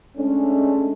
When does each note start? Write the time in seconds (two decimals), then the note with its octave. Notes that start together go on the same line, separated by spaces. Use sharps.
0.17 G#3 A3 C#4 D4